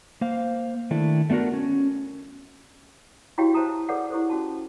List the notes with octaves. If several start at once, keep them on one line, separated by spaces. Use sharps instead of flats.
A#3 C5 F5
D#3 A3 D4 E4
A3 B3 D4 F#4 A#4
C#4
E4 F#4 G4 C#5 F5 G5
C5 C#5 E5 A5 A#5 D#6
G#4 A4 B4 C#5 D5 F#5
E4 G4 A4 C5
C#4 F#4 A5